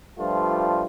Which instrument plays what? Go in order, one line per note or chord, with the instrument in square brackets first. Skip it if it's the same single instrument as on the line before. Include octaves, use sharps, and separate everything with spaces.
[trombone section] G2 F3 G3 A3 F4